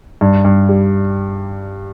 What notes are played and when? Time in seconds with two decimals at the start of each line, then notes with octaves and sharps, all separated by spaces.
0.21 G2
0.45 G2
0.69 G3